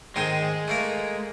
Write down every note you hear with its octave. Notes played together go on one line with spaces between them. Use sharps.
G#2 D#3 G#3 C4
A3 A#3 A#4